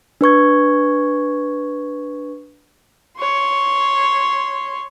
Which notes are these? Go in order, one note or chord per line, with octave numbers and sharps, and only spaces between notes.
D4 B4 C#6 G#6
C#5 C6